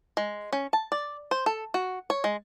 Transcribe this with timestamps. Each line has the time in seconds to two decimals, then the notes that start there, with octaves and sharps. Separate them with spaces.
0.17 G#3
0.53 C#4
0.73 A5
0.92 D5
1.31 C5
1.46 A4
1.74 F#4
2.10 C#5
2.24 G#3